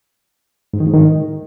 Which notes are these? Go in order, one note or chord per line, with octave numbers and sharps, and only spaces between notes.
G#2
D#3
G#2
D#3